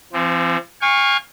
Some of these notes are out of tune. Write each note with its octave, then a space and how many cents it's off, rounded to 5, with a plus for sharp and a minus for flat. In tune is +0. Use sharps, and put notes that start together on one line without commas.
F3 -40 C4 +0
F5 +10 G#5 -35 C#6 -5